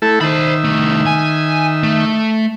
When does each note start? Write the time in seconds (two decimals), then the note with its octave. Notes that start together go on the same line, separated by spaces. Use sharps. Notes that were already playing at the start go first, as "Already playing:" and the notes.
0.02 A3 E4 A4
0.21 D#3 C5 E5 B5
0.64 C2 A3
1.07 G#5
1.83 A3